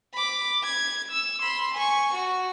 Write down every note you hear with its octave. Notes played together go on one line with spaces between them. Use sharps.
B5 D6
G#6
E6
B5 C6
G#5 C#6
F#4